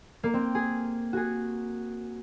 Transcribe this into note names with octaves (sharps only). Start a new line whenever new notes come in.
A#3
C4
G#4
F#4 G#4